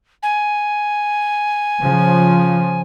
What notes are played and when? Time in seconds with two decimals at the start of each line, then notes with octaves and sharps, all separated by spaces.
0.23 G#5
1.82 C#3 F3